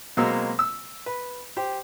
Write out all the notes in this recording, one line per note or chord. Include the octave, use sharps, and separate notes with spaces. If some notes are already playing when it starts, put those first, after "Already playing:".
B2 F#3 G#3 A#3 C4 E6
E6
B4
G4 C5